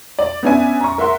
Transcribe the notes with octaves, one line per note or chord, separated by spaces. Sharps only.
D5
B3 C#4 D4 E5 G#5
A#5 C#6
A#4 E5 F#5 C6